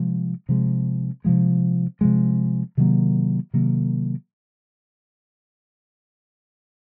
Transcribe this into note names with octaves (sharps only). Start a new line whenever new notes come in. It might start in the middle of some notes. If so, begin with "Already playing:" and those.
Already playing: C3 F3 G#3
C3 F3 G#3
C3 F3 G#3
C3 F3 G#3
C3 D#3 F#3 A#3
C3 D#3 F#3 A#3